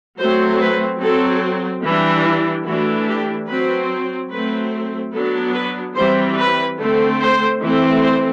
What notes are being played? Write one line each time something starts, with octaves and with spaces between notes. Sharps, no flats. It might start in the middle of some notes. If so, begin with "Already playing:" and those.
F#3 A3 C4 C5
B4
F#3 C4 A4
E3 G3 D4
E4
E3 A3 D4 F#4
G4
F#3 C4 B4
F#3 A3 C4 B4
F#3 B3 D4 A4
B4
E3 G3 C4 C5
B4
D3 A3 C4
C5
E3 A3 C4
C5